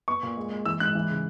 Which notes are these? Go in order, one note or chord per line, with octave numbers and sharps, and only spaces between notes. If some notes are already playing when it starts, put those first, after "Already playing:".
B3 C#6
A#2
G#3
G#3
E3 E6
G#2 F#6
E3
C#3